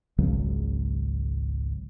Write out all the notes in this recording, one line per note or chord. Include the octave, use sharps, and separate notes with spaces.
G#1 C#2 C#3 F#3